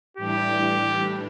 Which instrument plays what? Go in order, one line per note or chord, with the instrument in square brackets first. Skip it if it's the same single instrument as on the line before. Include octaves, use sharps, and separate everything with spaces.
[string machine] A2 E3 G3 D4 [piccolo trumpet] G4